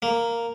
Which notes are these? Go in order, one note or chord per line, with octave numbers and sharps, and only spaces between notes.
A#3